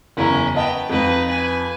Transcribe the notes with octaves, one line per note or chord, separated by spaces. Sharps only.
F#1 E2 C#4 E4 A#5
B3 D#5 G5 A5
F2 F3 D#4 B4
B4 G#5